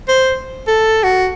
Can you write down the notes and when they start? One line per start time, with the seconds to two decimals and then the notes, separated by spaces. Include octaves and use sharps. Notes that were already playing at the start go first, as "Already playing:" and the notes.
0.08 C5
0.68 A4
1.03 F#4